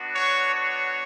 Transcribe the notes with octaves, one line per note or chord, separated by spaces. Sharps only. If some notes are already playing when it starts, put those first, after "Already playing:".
Already playing: B3 D4 F#4
C#5
C#5